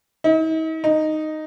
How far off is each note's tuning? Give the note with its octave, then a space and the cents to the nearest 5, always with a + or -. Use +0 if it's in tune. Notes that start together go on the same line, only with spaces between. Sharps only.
D#4 +45
D#4 -5